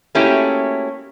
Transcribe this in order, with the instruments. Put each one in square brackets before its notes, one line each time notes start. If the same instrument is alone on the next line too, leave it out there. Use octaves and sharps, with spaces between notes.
[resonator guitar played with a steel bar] A3 A#3 C#4 E4 F#4 G4